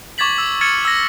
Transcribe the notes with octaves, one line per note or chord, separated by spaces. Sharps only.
C#6 D6 G#6 A6 B6 F#7
E6
F6 G#6 A6 C#7 D#7
E6 A#6